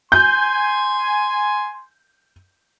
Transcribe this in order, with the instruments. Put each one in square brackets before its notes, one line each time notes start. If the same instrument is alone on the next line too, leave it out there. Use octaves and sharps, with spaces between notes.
[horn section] G#5 C6 [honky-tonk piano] G6